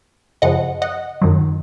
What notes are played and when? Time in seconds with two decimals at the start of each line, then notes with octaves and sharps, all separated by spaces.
0.42 F#2 C#3 F3 D#5 F#5
0.82 D#5 F#5
1.22 F#2 D#3 F#3